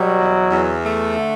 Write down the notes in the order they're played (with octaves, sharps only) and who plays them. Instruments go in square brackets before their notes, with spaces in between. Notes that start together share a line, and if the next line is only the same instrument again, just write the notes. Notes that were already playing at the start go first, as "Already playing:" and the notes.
Already playing: [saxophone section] B2 G3 [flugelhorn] F#3
[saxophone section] E2
E2
A3
D3